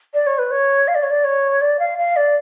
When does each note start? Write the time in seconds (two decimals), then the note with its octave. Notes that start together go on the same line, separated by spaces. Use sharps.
0.14 D5
0.26 C#5
0.38 B4
0.51 C#5
0.88 F5
0.95 D5
1.03 C#5
1.10 D5
1.24 C#5
1.61 D5
1.79 F5
1.98 F5
2.16 D5